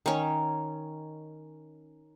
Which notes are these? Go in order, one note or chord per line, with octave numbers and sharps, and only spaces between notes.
D#3 C#4